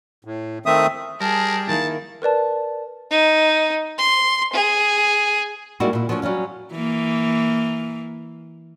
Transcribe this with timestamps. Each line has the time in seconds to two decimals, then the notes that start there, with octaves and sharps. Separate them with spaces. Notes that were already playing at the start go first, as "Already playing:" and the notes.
0.25 A2
0.66 D#3 A3 C4 E5 D#6
1.21 G3 G#4 A#4 A5
1.68 D#3 A#3 E4 A5
2.22 A#4 B4 D5 A5
3.11 D#4
3.98 C6
4.53 G#4
5.80 G3 G#3 A#3 D#4 E4 F#4
5.93 A#2 E4
6.09 F3 F#3 A3 C4 C#4
6.22 F#3 G3 C#4 F5
6.72 E3 A#3